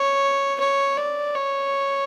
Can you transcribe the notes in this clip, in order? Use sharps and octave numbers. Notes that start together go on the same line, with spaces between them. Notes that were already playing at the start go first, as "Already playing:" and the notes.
Already playing: C#5
C#5
D5
C#5